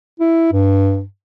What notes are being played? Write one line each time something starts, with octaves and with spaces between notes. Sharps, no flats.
E4
G2